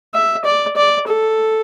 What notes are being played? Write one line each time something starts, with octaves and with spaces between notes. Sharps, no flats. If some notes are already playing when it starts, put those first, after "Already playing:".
E5
D5
D5
A4